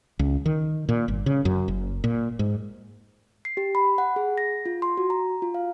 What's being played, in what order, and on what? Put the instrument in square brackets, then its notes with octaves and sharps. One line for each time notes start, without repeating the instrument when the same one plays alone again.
[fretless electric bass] C#2
D#3
A#2
G1
C#3
F#2
F#1
A#2
G#2
[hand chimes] C7
G4
B5
F#5
G#4
A#6
F4
C6
F#4
A#5
F4
F5